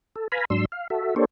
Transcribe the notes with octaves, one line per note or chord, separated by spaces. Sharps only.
A4
B4 F5 G#5 A#5 B5
G#2 F#3 D4 C6 E6
F5
F#4 A4 E5
A#3 D4 G4 A4 C5 C#5